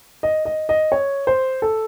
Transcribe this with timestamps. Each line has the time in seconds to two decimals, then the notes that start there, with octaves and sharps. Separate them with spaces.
0.23 D#5
0.45 D#5
0.69 D#5
0.92 C#5
1.27 C5
1.62 A4